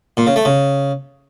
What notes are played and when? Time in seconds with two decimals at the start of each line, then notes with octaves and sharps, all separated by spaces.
0.17 A#2
0.27 C#3
0.36 A3
0.45 C#3